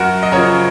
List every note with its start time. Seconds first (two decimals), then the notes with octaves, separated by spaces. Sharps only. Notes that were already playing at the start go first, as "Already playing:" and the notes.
Already playing: F#2 F#4 A#4
0.23 D#5
0.32 C#3 F3 A#4 C#5